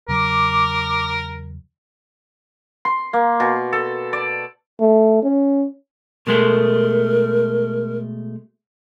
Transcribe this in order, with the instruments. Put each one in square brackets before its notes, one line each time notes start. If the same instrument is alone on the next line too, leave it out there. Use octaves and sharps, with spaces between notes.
[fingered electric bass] E2 C#3 F#3 [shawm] A#4 [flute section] D6
[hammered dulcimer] C6
A#3
B2
A4
D5
[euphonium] A3
C#4
[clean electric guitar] B2 G#3 A3 [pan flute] A#4